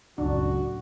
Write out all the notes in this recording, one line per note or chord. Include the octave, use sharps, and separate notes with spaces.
F#1 C#2 F#2 A2 D4 F#4